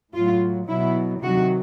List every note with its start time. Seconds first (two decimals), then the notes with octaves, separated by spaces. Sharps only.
0.14 A2 F#3 F4
0.69 B2 F#3 E4
1.22 C3 D#3 F#3 F#4